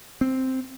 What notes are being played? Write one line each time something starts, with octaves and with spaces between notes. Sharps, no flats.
C4